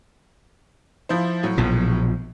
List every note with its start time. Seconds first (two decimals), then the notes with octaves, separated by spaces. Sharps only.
1.09 F3 E4 C5
1.43 A2 F#3
1.58 A#1 B2 F3